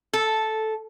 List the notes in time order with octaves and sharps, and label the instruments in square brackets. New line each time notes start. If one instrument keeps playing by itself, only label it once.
[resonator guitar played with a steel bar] A4